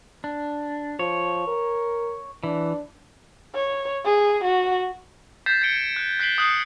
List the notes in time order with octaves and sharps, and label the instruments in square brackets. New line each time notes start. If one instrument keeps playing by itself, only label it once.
[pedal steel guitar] D4
[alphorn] F3 [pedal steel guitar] C#5
[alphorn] A#4
[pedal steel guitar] E3 [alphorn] D4
[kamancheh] C#5
G#4
F#4
[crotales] G6 A6 B6 C7 E7
G#6 B6 C#7 D7 G7
F#6
F#6 B6 C7 D7 F#7 G7
D#6 F#6 C7 C#7